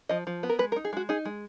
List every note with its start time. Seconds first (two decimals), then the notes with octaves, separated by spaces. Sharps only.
0.09 F3 D#5
0.27 F3
0.43 B3
0.49 A#4
0.59 G#3 B4
0.72 A#4
0.76 D#4
0.85 G#4
0.93 G#3 F#4
1.09 D#4 G#4
1.25 G#3